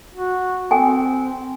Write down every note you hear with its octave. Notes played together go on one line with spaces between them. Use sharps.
F#4
C4 A4 G5 G#5